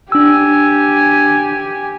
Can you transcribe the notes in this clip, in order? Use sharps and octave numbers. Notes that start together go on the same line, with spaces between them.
D4 G4 G#5 E6